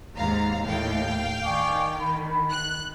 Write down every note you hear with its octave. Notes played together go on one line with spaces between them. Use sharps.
D#2 G#2 F5 A#5
D#2 A2 D#3 F5 G5
D#3 D5 G#5 C#6
B5
F#6